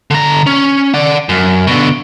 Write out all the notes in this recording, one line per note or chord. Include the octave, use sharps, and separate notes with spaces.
D3 A#5
C#4
D5 F#5
F#2
B2 D3